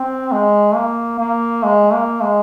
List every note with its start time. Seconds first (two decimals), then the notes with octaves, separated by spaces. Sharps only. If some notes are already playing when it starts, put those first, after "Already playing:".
Already playing: C4
0.32 G#3
0.75 A#3
1.20 A#3
1.64 G#3
1.93 A#3
2.23 G#3